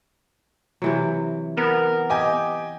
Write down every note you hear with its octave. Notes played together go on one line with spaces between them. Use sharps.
C3 E3 F#3
B3 A#4
G4 D#5 G5 G#5